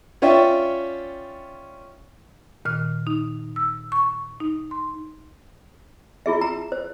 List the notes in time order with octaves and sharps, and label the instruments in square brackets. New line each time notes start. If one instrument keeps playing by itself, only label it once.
[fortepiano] C#4 F4 C#5 D5 E5 G5
[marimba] A#2 D#3 F6
D#4
E6
C#6
D#4
C6
[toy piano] E4 F4 G#4 E5
A#5
C5